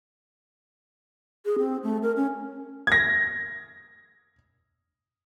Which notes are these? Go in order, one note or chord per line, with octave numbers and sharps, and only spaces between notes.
G#4
C4
A3
A#4
C#4
G#6 A#6